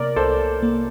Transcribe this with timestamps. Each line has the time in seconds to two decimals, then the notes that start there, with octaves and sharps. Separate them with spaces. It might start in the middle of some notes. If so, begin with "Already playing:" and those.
Already playing: C3 A#3 A#4 D5
0.16 C2 A4 C5
0.63 A#3